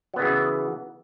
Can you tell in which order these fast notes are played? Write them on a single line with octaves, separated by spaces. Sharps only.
F#3 B3 C#3 E3